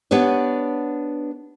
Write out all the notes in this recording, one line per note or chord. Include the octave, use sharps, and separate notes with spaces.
B3 D4 G4 B4 C#5